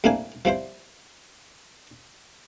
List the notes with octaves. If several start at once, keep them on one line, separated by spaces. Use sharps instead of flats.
C2 A2 A#3 D4 E4 G#5
F3 G3 E4 C5